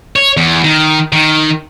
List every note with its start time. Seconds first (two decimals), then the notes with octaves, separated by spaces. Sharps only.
0.16 C#5
0.37 E2
0.64 D#3
1.12 D#3